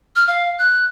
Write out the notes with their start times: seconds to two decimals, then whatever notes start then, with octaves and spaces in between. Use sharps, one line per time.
0.16 F6
0.28 F5
0.59 F#6